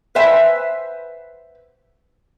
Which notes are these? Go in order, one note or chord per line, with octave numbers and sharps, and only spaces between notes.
B4 C5 E5 G#5